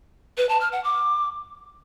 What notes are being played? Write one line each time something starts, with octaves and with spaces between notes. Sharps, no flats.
B4
A5
F6
F#5
D6